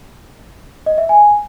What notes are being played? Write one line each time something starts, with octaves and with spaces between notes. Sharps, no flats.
D#5
E5
G#5